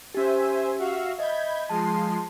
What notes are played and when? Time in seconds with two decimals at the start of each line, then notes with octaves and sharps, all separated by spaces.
0.14 C#4 G4 C5 E5 G#5
0.79 F#4 E5 F5
1.19 D#5 E5 B5 G6 G#6
1.69 F3 G#3 A5 C6